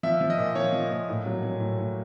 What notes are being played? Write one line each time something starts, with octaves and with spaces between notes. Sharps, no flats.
F3 E5
F3
D#5
A#2
F3 C#5
F3
A#2
A2
F#3
F#3
A2
A2